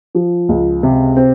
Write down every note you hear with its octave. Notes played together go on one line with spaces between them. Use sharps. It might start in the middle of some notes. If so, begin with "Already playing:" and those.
F3
C#2
C3
C4